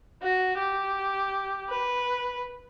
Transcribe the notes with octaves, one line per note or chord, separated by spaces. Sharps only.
F#4
G4
B4